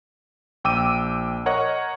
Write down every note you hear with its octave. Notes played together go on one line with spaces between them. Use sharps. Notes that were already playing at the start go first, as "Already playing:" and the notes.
A#1 G5 D6 E6 D#7
A#4 C#5 D#5 F#5 C#6